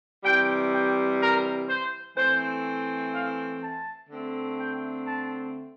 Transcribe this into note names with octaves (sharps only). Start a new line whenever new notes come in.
C3 E3 G3 G5
G5
A#4
C5
E3 A3 C4 C5
F5
A5
D3 A3 C4
G5
A5